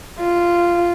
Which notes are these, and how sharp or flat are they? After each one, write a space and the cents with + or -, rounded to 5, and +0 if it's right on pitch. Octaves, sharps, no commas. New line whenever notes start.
F4 -10